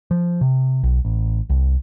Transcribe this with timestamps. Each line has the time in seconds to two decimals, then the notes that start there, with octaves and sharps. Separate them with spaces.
0.11 F3
0.41 C3
0.83 B1
1.05 A1
1.50 C2